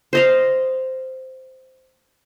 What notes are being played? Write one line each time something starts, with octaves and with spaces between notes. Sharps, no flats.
C5 D#5 F5